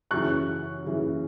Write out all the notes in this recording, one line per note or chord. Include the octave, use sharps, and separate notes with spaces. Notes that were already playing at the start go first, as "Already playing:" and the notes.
F#2 C#3 E3 C#6 F#6
F#2 C#3 E3